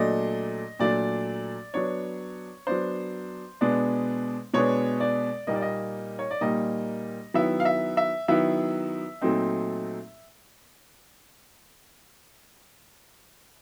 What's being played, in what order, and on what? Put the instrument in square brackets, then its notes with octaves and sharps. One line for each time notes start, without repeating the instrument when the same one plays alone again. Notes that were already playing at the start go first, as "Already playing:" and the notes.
Already playing: [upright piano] A#2 F#3 A3 D4 D#5
A#2 F#3 A3 D4 D5
F#3 B3 D4 C#5
F#3 B3 D4 C5
B2 G#3 B3 D4
B2 G#3 B3 D4 C#5
D5
A#2 G3 A#3 D#4 D#5
D5
D#5
C#5
D5
A#2 G3 A#3 D#4 D#5
D#3 F#3 B3 E4 E5
F5
E5
E5
D#3 F#3 B3 E4 E5
A#2 F#3 A3 C4 D#4